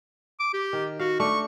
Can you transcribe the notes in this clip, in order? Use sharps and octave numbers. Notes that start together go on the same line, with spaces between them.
D6
G4
D#3
F#4 F5
A3 D4 C#6